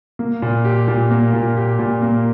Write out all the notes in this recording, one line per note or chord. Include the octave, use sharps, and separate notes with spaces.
A#3
A#2
G4
A#2
A#3
A#2
G4
A#2
A#3